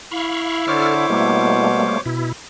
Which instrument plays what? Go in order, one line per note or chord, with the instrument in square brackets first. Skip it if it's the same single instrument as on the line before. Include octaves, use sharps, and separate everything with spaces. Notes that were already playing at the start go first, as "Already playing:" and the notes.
[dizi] E4 [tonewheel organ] F5 B5 C#6
[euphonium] D3 [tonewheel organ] A4 F6 [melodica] C5 C#5 D6
[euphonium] B2 [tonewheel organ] G3 A3 A#3
[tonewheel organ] B2 E4